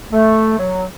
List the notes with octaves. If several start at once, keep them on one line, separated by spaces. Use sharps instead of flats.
A3
F#3